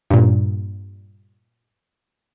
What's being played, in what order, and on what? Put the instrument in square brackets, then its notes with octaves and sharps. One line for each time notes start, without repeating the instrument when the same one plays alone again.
[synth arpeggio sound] G2 A#2